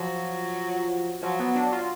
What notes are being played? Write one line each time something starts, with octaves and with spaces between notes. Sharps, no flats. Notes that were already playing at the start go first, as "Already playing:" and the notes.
Already playing: F3 F#3
F3 F#3
B3
D4
F4